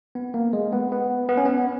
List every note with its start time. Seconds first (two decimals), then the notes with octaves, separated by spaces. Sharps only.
0.15 B3
0.34 A#3
0.53 G#3
0.73 B3
0.92 B3
1.29 B3
1.37 C#4
1.45 B3